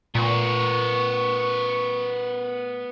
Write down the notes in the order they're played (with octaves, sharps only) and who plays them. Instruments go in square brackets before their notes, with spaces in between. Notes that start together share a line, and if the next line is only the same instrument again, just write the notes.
[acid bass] A#2 [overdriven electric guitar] B3 A#4 [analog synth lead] C#6